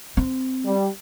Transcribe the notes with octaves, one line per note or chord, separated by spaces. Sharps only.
C4
G3